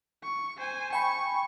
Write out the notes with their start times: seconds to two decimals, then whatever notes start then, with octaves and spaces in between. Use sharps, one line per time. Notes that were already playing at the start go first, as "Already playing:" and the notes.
0.23 C#6
0.58 C5 G#5
0.93 G5 G#5 B5 C#6